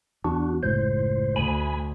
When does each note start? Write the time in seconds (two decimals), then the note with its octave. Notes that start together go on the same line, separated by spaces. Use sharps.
0.24 E2 D4 F#4
0.63 F#1 C#2 A2 C5
1.36 D2 G#5 B5